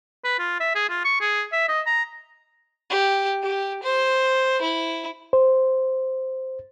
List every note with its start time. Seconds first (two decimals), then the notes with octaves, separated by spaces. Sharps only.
0.25 B4
0.39 F4
0.60 E5
0.75 G#4
0.89 F4
1.05 C#6
1.21 G#4
1.52 E5
1.69 D#5
1.87 A#5
2.90 G4
3.43 G4
3.83 C5
4.62 E4
5.33 C5